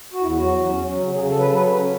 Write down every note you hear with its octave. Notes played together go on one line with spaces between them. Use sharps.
F#4
E2 E4
F#3 F#4
E2
C#4
F#3
C#3
C#3 G#4
F#3 A4
B4
F#3 A4
B4
C#4 A4
C#4